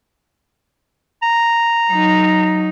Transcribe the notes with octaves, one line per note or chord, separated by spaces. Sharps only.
A#5
F#3 D#4